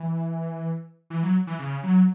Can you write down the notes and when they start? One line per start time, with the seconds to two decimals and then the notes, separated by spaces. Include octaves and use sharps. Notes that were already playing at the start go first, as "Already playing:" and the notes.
Already playing: E3
1.10 E3
1.23 F#3
1.47 E3
1.59 C#3
1.83 F#3